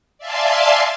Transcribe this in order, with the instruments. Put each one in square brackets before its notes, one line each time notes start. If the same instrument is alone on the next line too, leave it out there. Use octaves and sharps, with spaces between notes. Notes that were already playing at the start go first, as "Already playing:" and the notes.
[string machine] D5 E5 F5 G#5 A5 C6